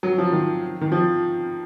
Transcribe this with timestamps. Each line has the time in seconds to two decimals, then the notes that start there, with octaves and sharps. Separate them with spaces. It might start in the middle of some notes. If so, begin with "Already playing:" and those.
0.03 F#3
0.18 F3
0.32 D#3
0.81 D#3
0.92 F3